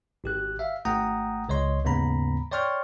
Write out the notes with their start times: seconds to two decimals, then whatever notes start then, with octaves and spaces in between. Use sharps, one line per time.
0.24 G#1 G4 F#6
0.59 E5 F5
0.85 G#1 A3 F#5 G5 A#5 D#6
1.49 C#2 C#5 D#5 C6
1.85 D#2 G#2 C#3 B3 A#5 B5
2.51 C#5 D5 G5 C6 C#6 F6